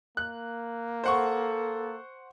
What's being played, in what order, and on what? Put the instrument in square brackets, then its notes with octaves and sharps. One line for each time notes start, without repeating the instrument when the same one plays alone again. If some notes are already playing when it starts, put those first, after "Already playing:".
[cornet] A#3 [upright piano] F#6
[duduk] A4 [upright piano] C5 F#5 C#6